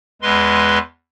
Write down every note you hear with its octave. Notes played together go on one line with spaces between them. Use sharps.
E2 G#3 B4 C6